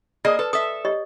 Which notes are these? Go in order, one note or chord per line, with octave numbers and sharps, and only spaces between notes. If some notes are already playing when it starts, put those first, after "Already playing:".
A#3 G#4 A#4 D5 D#5
A4 B4
A4 E5 D#6
G4 C#5 D#5